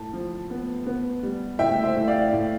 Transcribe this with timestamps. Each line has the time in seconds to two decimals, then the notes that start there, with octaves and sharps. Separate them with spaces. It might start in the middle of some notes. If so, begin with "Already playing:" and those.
Already playing: A2 A5
0.13 F3
0.50 B3
0.86 B3
1.23 G3
1.59 A2 E5 G5
1.84 C5 E5
1.96 A2
2.08 D5 F5
2.32 A2